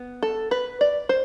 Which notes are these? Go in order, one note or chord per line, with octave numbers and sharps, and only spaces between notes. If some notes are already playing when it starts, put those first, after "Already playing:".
Already playing: B3
A4
B4
D5
C5